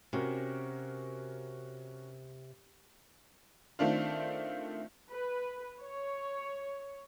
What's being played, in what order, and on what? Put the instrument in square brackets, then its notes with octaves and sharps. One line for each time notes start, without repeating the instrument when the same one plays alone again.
[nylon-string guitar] C3 [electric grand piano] C#4 F#4 A#4
[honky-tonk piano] D#3 A3 C4 D4 F4
[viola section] B4
C#5